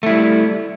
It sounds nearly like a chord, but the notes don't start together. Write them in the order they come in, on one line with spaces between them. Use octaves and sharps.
A3 E4 G3